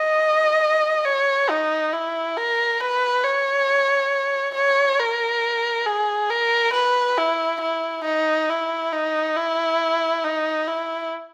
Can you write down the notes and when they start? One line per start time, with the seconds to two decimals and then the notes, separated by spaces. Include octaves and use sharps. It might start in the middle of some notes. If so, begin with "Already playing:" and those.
Already playing: D#5
1.05 C#5
1.50 D#4
1.93 E4
2.37 A#4
2.80 B4
3.24 C#5
4.55 C#5
4.99 A#4
5.86 G#4
6.30 A#4
6.74 B4
7.18 E4
7.61 E4
8.05 D#4
8.49 E4
8.92 D#4
9.36 E4
10.24 D#4
10.68 E4